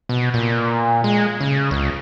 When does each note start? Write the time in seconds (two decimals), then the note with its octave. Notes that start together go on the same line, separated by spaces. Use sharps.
0.09 B2
0.34 A#2
1.04 G#3
1.41 C#3
1.71 C#2